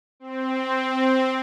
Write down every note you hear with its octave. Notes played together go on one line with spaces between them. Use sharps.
C4